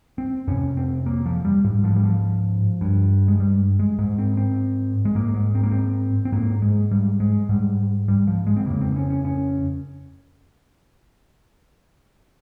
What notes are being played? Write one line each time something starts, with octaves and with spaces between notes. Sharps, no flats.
C4
F2 C3 C#4
C4
A#3
F3
G3
G#2 G3
F3
G3
F3
G2
G#3
G3
G#3
G#2 G#3
C4
C4
G#3
G#2 A#3
G#3
C4
A#3
C4
C4
G#2 A#3
G#3
G3
G#3
G#2 G3
G3
F3
G#3
C4
F2 C#3 A#3
C4
C#4
C#4
C#4